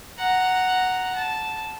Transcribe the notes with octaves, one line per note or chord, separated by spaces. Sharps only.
F#5 A#5
A5